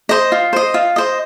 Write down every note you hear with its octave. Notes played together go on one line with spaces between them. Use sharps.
C5 D#5
F4
C5 D#5
F4
C5 D#5